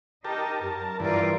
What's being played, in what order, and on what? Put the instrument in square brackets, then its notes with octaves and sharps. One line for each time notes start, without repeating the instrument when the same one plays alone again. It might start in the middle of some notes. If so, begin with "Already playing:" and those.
[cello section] D#4 [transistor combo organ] G4 A#4 A5
[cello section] F#2 [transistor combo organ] A#4 A5
[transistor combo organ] G2 E3 [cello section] F4 A#4 D5